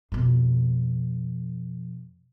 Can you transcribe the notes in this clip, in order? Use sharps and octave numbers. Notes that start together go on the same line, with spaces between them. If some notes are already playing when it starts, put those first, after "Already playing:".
F2 B2